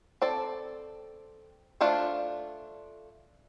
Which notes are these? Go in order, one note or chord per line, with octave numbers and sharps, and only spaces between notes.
C4 A4 D5
A3 D4 F4 C5